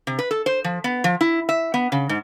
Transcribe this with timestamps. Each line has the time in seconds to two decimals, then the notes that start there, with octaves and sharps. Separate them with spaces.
0.07 C3
0.19 B4
0.31 A4
0.46 C5
0.64 F3
0.84 B3
1.04 F3
1.21 E4
1.49 E5
1.74 B3
1.92 C#3
2.09 G#2